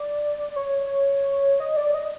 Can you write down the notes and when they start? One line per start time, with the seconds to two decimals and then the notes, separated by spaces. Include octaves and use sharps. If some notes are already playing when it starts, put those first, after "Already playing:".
Already playing: D5
0.56 C#5
1.60 D#5
1.77 D5
1.94 D#5